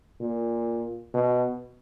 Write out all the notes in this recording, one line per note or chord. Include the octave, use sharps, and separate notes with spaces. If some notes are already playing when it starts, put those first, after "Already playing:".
A#2
B2